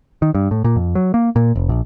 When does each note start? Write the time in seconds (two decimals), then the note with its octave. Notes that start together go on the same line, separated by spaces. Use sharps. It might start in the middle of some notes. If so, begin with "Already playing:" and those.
0.22 D#3
0.35 G2
0.51 A2
0.64 A#2
0.76 F2
0.95 F#3
1.14 A#3
1.36 A#2
1.56 F1
1.69 A#1